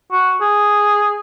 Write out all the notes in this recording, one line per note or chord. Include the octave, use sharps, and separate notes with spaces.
F#4
G#4